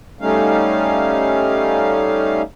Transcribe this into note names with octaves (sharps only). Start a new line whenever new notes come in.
G3 A3 C#4 D#4 F5